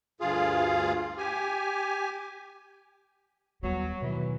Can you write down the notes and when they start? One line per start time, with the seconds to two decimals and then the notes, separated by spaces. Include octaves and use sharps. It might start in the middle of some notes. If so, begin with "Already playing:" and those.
0.21 D2 G2 F4 G#4 F5
1.18 G4 G#5
3.63 D#2 F#3 G3 B3
4.02 B2 D#3 E3 F#3